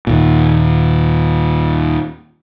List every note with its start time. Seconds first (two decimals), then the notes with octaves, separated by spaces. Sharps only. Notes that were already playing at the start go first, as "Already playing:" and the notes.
0.07 D#2 A#2